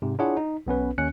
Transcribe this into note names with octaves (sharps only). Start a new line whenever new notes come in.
G#2 C3
D4 E4 F4 G#4 C#5 F#5
D#4
B1 B3 C#4 B4
D#2 C#4 F#6 C#7